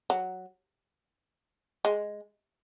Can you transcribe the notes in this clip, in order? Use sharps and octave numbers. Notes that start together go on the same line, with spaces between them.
F#3
G#3